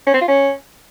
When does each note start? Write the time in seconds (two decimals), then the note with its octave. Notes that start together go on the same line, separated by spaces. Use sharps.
0.07 C#4
0.14 C4
0.21 F4
0.28 C#4